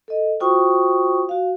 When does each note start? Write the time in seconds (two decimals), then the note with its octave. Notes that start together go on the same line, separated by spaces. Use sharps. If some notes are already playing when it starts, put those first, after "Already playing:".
0.08 A4 D#5
0.40 F4 F#4 C5 G5 C#6 D#6
1.29 F#4 F5